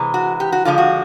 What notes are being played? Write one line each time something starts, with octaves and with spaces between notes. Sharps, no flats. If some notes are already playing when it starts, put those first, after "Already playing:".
Already playing: C3 E3 G#3
F#4
G4
F#4
D3 F3 G#3 F4
F#4